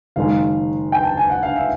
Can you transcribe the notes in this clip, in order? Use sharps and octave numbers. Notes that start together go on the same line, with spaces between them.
F#1 F#2 D#3 G#3 F5
G5
A5
G#5
F#5
F5
E5